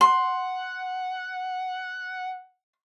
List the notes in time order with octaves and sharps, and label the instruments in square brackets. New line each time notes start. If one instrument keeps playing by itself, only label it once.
[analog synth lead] F#5 [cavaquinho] C6